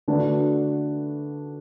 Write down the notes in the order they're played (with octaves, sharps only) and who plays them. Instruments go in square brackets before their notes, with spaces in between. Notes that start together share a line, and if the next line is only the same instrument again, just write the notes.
[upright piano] D3 A3 D4 F#4 B4